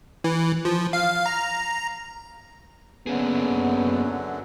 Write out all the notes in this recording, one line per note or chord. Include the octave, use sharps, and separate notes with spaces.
E3
F3
F5
A#5
F#2 D3 F#3 A#3 B3 C#4 G#4